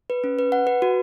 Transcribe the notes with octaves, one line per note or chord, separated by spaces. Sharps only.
B4
C#4
B4
F#5
B4
F#4